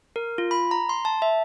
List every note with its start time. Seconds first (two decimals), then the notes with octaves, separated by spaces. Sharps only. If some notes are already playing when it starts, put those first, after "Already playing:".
0.16 A#4
0.38 F4
0.51 B5
0.71 A#5
0.89 C6
1.05 A5
1.22 E5